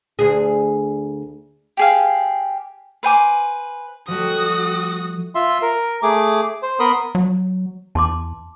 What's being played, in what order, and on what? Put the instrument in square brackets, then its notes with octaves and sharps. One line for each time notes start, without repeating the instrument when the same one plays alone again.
[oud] D2 G#4
[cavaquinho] G4 G#4 F5
B4 C5 G#5 D6
[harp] F3 G3 A3 [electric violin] F#4 D#6
[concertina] F4 E5 C6
A#4
A3 G#4 D6
C5
B3 A#4 B5 C6 D#6
[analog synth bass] F#3
[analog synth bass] E2 [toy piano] A5 C6 D6